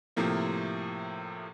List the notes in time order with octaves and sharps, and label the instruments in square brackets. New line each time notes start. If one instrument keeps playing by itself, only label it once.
[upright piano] A2 C3 F3 A#3